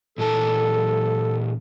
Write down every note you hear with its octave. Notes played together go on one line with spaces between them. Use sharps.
A#2 E3 A4 A5